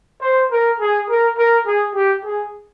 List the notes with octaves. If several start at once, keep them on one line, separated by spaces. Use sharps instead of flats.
C5
A#4
G#4
A#4
A#4
G#4
G4
G#4